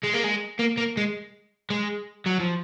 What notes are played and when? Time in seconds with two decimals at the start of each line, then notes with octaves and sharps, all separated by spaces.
0.04 G#3
0.14 A#3
0.24 G#3
0.59 A#3
0.78 A#3
0.97 G#3
1.70 G#3
2.26 F#3
2.40 F3